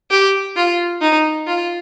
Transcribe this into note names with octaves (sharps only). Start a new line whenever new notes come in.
G4
F4
D#4
F4